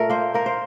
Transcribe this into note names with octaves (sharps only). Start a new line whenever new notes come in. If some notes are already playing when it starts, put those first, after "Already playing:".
Already playing: A#2 A3 A#4
A#3 C5
A#3 A#4
C5